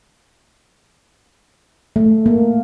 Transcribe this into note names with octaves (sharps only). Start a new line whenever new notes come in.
A3
A#3